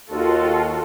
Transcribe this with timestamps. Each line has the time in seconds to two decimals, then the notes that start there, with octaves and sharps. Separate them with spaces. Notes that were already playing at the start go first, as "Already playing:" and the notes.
0.12 D#2 F4 F#4 A4